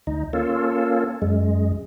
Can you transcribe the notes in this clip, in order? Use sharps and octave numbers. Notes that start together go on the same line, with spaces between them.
D2 D#4
A#3 C#4 F4 A4
F#2 G#3